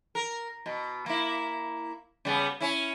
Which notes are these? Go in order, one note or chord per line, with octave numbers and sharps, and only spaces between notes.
A#4
B2
A#3 E4
C#3 G3 B3
C#4 E4